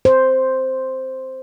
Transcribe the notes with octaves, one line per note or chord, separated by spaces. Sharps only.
C5